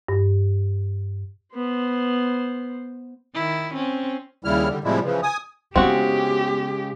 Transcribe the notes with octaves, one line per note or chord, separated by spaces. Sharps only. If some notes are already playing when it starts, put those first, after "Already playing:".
G2
B3 C5
D#3 E4
C4 C#4
D#2 C#3 G3 E4 F6
D3 G3
A2 C3 F3 G3 G#3 E4
C#3 E3 F3
G#5 D#6
C#3 G#3 B3 C4 E4 F#4 G4